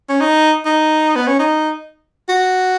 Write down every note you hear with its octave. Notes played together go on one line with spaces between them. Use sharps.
C#4
D#4
D#4
B3
C#4
D#4
F#4